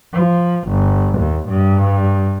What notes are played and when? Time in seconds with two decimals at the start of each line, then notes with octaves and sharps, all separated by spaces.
0.14 F3
0.69 G1
1.19 D#2
1.49 G2